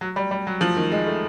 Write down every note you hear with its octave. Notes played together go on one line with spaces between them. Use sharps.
F#3
G3
G3
F#3
F3
D#3
G#3
A3